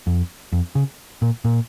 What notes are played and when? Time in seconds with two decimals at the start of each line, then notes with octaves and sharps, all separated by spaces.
0.07 F2
0.52 F2
0.75 C#3
1.22 A#2
1.45 A#2